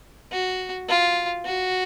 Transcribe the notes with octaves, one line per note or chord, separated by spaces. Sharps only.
F#4
F4
F#4